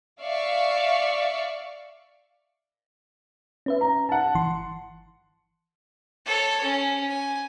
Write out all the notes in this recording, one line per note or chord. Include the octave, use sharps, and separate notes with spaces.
D5 E5 F5 C#6
C#4 B4 E5
A#5
F#5 A5
G1 E3 C6
A4 C#5
C#4
G#5